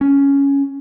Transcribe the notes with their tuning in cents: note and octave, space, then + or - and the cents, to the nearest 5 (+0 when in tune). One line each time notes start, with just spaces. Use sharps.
C#4 +5